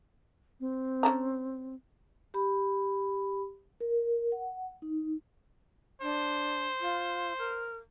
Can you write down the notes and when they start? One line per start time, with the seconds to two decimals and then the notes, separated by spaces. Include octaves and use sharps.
0.60 C4
1.03 C#4 A4 A#5
2.34 G4 B5
3.81 A#4
4.32 F#5
4.82 D#4
6.02 D4 C5
6.80 F4
7.38 A#4